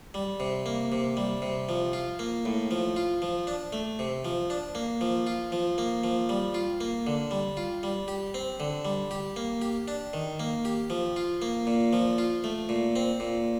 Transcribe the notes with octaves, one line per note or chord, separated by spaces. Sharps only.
G3
C3
A#3
C3
G3
C3
F3
F4
A#3
A2
F3
F4
F3
D4
A3
C3
F3
D4
A#3
F3
F4
F3
A#3
F3
G3
F4
A#3
D3
G3
F4
G3
G4
C4
D3
G3
G4
A#3
G4
D4
D#3
A#3
G4
F3
F4
A#3
A#2
F3
F4
A3
A#2
C4
A#2